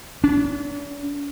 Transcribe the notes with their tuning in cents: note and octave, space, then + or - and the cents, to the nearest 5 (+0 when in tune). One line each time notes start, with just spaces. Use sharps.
D4 -45